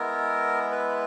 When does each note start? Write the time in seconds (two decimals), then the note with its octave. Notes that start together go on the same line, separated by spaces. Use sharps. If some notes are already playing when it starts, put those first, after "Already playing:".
Already playing: G#3 B3 E4 A#4
0.72 B4